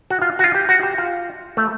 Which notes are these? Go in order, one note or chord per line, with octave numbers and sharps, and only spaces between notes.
F#4
F4
F#4
F4
G4
F#4
G4
F4
A3